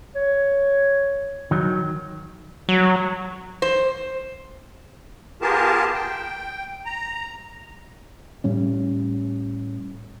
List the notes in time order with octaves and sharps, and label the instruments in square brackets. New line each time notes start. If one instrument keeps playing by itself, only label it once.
[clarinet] C#5
[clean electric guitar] D#3 F#3
[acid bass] F#3
[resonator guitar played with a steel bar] C5
[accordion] B3 F4 G4 G#4 A#4 A5
G5
A#5
[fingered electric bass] A2 G3 C#4